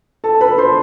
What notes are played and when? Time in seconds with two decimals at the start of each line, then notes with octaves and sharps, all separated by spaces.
0.24 A4 A5
0.41 B4 B5
0.58 C5 C6